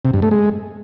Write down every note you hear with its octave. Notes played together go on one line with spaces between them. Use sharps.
C3
G2
A3
G#3